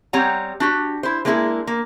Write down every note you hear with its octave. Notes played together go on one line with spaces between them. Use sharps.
G3 C4 C#5 F#5 G#5 A#5
D4 F#4 G4
E4 C5
G#3 A#3 D4 E4 F#4 G#4
A#3